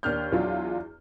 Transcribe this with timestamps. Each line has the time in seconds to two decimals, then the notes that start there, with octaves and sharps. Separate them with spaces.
0.03 D#2 D4 F6 G6
0.32 E2 F#3 D4 F4